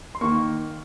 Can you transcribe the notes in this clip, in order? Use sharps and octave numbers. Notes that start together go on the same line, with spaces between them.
C6
D#3 A#3 C#6